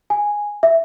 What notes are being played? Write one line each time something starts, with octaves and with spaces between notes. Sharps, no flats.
G#5
E5